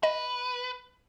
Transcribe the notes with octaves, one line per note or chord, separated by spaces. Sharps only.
B4 D#5